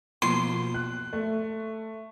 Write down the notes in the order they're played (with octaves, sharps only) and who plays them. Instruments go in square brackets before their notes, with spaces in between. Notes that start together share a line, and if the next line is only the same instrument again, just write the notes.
[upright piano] B2 F3 A#3 [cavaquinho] C6
[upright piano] F#6
A3